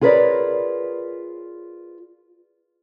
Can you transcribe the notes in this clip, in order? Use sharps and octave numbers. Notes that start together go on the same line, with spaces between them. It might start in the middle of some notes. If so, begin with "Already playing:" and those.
F4 G#4 A#4 B4 C#5 D5